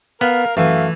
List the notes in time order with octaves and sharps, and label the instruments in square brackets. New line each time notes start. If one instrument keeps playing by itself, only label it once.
[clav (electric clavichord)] B3 [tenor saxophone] A#4 [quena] F5
[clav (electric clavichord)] F#2 [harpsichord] E3 [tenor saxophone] A3 [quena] F5